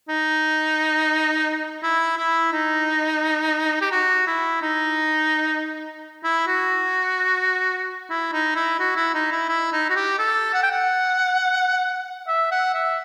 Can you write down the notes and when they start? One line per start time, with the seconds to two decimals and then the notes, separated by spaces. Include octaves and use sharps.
0.09 D#4
1.83 E4
2.18 E4
2.52 D#4
3.81 G4
3.92 F#4
4.27 E4
4.62 D#4
6.24 E4
6.47 F#4
8.10 E4
8.33 D#4
8.56 E4
8.79 F#4
8.96 E4
9.14 D#4
9.32 E4
9.49 E4
9.72 D#4
9.90 F#4
9.96 G4
10.19 A4
10.53 F#5
10.63 G5
10.71 F#5
12.28 E5
12.51 F#5
12.74 E5